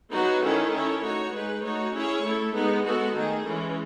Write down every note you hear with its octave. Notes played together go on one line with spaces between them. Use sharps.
F#3 B3 D#4 F#4 B4
D#3 A3 C#4 E4 A4
C#4 E4 A4 C#5
A3 D#4 F#4 C#5
G#3 D#4 G#4 B4
A3 D#4 F#4 C#5
C#4 E4 G#4 C#5
A3 E4 A4
G#3 B3 D#4
G#3 B3 F#4 A4
D#3 A3 D#4 G#4
E3 G#3 C#4